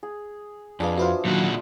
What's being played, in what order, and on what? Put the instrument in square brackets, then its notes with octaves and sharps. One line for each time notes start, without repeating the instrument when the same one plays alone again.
[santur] G#4
[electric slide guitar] F2 [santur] D4 G#4 F5 [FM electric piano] B4 G#5
[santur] F4 E5 [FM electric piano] F#4 B4 C5
[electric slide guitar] A#2 D3 F#4 [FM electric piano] D#3 F#3